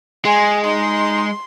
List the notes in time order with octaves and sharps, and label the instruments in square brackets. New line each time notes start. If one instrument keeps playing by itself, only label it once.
[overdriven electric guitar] G#3 [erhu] G#5 [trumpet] C6
[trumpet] D#4 [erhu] C6